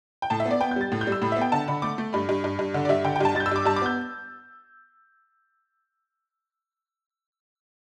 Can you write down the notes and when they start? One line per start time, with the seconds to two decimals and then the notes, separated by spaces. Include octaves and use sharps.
0.22 G5
0.30 A2 A5
0.40 E5
0.45 B3
0.51 D5
0.61 B3 G5
0.71 G6
0.76 G3 A6
0.92 A2
1.01 G6
1.07 G3
1.12 E6
1.22 A2 B5
1.32 E5
1.36 B3
1.41 G5
1.52 D3 A5
1.68 D3 B5
1.82 A3 D6
1.98 A3
2.13 G2 B5
2.29 G2
2.44 G2
2.59 G2
2.74 D3
2.85 D5
2.89 G2 E5
3.04 D3 G5
3.16 G5
3.20 G2 A5
3.35 G2 A6
3.40 G6
3.46 E6
3.51 G2 D6
3.65 G2 A5
3.76 D6
3.82 B3 G6